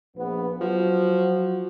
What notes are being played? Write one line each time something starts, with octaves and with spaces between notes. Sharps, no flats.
A#1 B3
F3 F#3 F#4